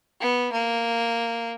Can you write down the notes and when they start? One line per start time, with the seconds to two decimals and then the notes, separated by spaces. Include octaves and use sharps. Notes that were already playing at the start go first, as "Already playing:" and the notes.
0.21 B3
0.52 A#3